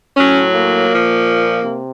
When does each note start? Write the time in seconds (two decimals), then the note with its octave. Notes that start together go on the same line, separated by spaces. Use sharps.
0.17 A2 F#3 C#4
0.53 A#3
0.90 A#2 F3
1.63 C3